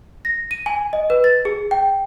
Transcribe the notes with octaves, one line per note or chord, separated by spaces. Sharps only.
A#6
D#7
G#5
D#5
B4
A6
G#4
G5